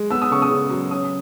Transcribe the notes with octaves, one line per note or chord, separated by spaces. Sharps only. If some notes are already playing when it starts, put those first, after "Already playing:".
Already playing: G#3
B3 E6
D#6
C#3 C#6
D#6
C#3
F#3
C#4 D#6